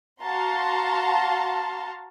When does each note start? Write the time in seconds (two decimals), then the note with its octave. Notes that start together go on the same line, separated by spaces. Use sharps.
0.22 F#4 F5 A5 A#5 C6